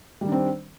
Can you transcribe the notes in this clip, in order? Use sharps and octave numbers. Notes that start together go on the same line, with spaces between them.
D#3 G3 C4 D4